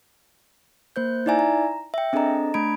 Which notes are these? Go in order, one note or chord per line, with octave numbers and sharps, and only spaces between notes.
A#3 C5 G6
D#4 E4 D5 E5 G#5 A#5
A#5
E5 G5
C4 D4 G#4 A4 D#5 A#5
A3 D4 A#5 B5 G#6 D7